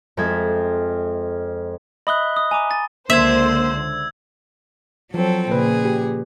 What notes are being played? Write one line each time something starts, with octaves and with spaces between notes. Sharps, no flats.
F2 G#3 C4 A4 E5 G#6
D#5 E5 B5 D#6 F#6 G7
D#6
G#5 A#5 D6
G#5 A6
C#2 D3 A#3 C5 E5 E6 G#6
F3 F#3 C4 A4
A#2 C#3 G#4 B4
G4